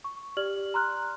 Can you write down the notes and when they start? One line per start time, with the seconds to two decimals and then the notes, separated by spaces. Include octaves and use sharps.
0.04 C#6
0.37 G4 D5 F6 F#7
0.74 A#5 C6 F6 F#6